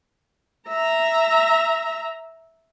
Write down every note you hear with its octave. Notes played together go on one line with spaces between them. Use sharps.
E5 A#5